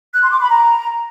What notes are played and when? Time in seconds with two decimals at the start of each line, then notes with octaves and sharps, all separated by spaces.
0.13 F#6
0.22 C6
0.31 D6
0.40 B5
0.49 A#5